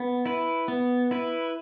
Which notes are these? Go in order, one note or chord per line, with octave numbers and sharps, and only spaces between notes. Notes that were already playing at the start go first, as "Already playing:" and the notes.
Already playing: B3
E4 B4
B3
E4 B4